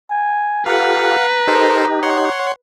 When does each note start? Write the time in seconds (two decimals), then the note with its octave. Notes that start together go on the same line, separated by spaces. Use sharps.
0.10 G#5
0.66 F4 G4 A4 B4 F5 F#5 A#5
1.47 D#4 G4 A4 A#4 C5
2.03 C#5 F#5 C6